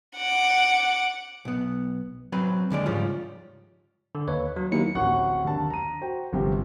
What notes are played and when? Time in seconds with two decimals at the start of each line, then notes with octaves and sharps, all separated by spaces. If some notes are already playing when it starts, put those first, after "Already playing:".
0.17 F#5 D6
1.45 B1 B3
2.32 F#3 C4 B4
2.70 D#2 D3 G#3 D5
2.86 G#2 C#3 F3 G3 C#4 F4
4.15 D3
4.28 D#2 B4 C#5
4.56 F#3
4.72 D#2 F#3 E4 C#7
4.95 D1 A1 F#5 C#6 F#6
5.45 D#2 D3 A5
5.70 A#5 D#7
6.01 F#4 C5 G5
6.33 G1 C3 F3 G4